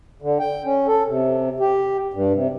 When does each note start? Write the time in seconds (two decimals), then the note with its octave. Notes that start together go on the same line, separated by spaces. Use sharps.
0.22 D3
0.39 G5
0.65 C#4
0.87 A4
1.07 C3
1.60 G4
2.14 G2
2.33 C3